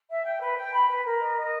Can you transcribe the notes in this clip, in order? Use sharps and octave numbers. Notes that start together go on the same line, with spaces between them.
E5
G5
B4
G5
B5
B4
A#4
D#5
D#5